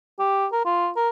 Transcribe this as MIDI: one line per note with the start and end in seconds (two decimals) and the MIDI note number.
0.19 0.46 67
0.52 0.60 70
0.65 0.89 65
0.96 1.10 70